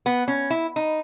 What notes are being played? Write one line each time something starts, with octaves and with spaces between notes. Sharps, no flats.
B3
C#4
E4
D#4